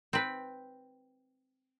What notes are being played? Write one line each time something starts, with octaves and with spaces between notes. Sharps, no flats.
C4 B4